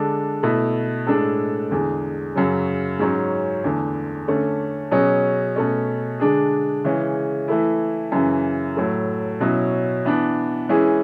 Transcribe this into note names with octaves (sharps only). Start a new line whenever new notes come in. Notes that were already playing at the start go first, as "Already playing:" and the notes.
Already playing: D3 G#3 D4 A4
B2 A3 E4
A2 G#3 D4 A4
E2 D3 G#3
F#2 C#3 F#3
G#2 F#3 C#4
E2 D3 A3
D3 A3 C#4
B2 F#3 C#4 G#4
B2 A3 C#4
D3 G#3 D4 G#4
C#3 E3 G#3 C#4
E3 A3 E4
F#2 C#3 E3
A2 F#3 A3
B2 F#3 C#4 E4
E3 B3 D4
E3 G#3 C#4 E4 G#4